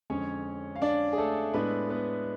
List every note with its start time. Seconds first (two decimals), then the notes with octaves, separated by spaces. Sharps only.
0.10 F2 D3 G#3 C#4 C#5
0.76 F5
0.82 D4 D5
1.13 G#4
1.18 A3 A4
1.53 A2 G#3 B3 D4 B4
1.89 B3 B4